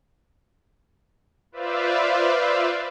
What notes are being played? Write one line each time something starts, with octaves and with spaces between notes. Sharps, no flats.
F4 B4 C5 D5 E5 F5